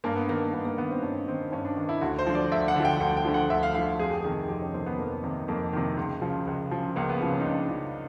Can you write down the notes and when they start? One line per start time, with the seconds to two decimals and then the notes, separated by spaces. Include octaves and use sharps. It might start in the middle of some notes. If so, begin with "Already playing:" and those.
0.04 G2 A#3
0.16 B3
0.28 D#3 A#3
0.54 G2 B3
0.65 A#3
0.78 D#3 B3
0.91 C4
1.03 G2 C#4
1.27 D#3 C4
1.52 G2 C#4
1.65 D4
1.77 D#3
1.89 E4
2.01 D2 F#4
2.19 C5
2.27 D3 F3
2.35 D5
2.52 D2 E5
2.68 F#5
2.76 D3 F3
2.85 G5
3.00 D2 F#5
3.17 G5
3.25 D3 F3
3.34 F#5
3.50 D2 E5
3.63 F5
3.74 D3 F3 F5
3.99 F2 G#4
4.10 G4
4.21 C3 D#3 G#4
4.48 F2 G4
4.62 C#4
4.74 C3 D#3 C4
4.86 B3
4.98 F2 A#3
5.24 C3 D#3
5.48 F2 A#3
5.73 C3 D#3
5.97 C#2
6.21 C#3 F3
6.47 C#2
6.71 C#3 F3
6.96 C#2 A#3
7.09 B3
7.20 C#3 F3
7.33 C#4
7.40 D#4
7.46 C#2 D4
7.70 C#3 F3